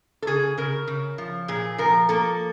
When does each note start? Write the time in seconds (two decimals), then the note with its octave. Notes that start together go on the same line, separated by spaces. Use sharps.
0.22 A4
0.27 C#3 G#4
0.57 C#3 A#4
0.87 C#3
1.18 F3
1.48 A#2 G#4
1.78 F3 A#4
2.09 A#3 A4